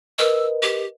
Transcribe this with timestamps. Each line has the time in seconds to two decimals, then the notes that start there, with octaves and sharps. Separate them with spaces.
0.19 A#4 B4 D#5 E6
0.62 G4